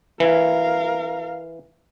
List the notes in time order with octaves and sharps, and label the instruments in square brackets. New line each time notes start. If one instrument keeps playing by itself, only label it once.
[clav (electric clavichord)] E3 [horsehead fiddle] A#4 F5